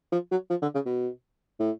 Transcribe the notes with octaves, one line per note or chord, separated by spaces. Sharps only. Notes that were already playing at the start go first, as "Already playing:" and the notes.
F3
F#3
F3
D3
C#3
B2
A2